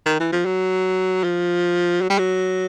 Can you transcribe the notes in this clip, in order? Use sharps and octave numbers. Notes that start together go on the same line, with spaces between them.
D#3
E3
F3
F#3
F3
F#3
G3
F#3